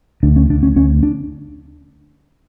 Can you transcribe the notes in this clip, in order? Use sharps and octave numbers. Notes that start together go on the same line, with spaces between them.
D2 D4
C#4
D2 D4
C#4
D2 C#4
D4